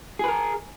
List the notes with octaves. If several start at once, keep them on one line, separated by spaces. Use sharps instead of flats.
G#4 A#4 B4